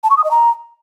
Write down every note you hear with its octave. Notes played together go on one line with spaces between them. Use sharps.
A5
C#6
D#6
D#5
A#5